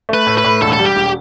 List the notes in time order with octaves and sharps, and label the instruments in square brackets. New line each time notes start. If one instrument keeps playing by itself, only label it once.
[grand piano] A3 [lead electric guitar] B4
[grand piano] A2
[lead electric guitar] B4
[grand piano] A2
[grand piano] E1 [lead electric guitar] A4
[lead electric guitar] A4
[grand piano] G3
[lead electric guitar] G4
[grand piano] E1